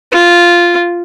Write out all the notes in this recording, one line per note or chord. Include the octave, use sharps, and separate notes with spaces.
F4